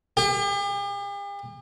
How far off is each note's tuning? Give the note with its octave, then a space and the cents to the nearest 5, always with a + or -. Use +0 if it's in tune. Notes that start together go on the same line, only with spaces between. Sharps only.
G4 +45